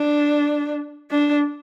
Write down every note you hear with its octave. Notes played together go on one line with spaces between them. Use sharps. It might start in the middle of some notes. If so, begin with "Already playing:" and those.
Already playing: D4
D4